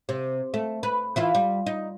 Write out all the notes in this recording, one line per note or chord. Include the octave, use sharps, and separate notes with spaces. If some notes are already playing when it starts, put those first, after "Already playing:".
C3
A3
B4
E3 E4 F4
G3
D#4